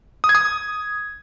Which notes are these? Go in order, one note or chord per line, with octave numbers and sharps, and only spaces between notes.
D#6
G#6
D#6